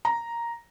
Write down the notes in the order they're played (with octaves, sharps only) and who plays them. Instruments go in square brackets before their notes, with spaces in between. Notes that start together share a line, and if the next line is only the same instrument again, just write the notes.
[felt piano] A#5